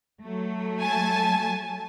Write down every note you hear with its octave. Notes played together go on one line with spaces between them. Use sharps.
F#3 A3
G#5 A5